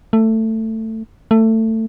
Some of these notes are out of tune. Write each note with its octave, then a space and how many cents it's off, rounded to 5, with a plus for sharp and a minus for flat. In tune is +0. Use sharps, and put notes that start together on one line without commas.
A3 +15
A3 +20